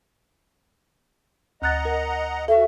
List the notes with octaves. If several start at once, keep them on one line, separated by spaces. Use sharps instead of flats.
D2 D#5 F#5 A#5 F#6 A6
A#4
F#4 A4 E5